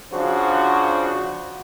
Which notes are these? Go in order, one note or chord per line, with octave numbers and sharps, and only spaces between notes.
C#3 F3 D4 F#4 C5